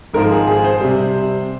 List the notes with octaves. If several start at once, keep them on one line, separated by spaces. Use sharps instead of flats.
G#1 G#2 F3 A#4
G#4
G#4
C5
C3 G3